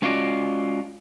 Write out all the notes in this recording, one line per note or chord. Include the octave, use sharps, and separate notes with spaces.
G#3 C#4 F4 F#4 D5 D#5